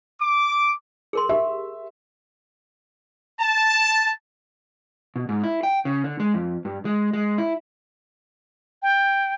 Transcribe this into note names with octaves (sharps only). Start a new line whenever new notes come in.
D6
G#4 A#4 C6
G4 E5
A5
B2
G#2
E4
G5
C#3
D3
G#3
F2
G2
G#3
G#3
E4
G5